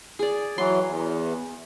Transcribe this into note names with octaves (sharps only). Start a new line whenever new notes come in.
G#4 D5
E3 F#3 C6
E2